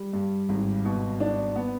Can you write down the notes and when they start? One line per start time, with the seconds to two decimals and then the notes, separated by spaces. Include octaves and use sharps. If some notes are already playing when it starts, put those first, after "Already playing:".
Already playing: G3
0.13 G2
0.49 G#1
0.85 B2
1.20 D4
1.56 B3